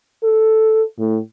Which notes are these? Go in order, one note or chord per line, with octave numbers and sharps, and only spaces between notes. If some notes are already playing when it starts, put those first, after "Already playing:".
A4
A2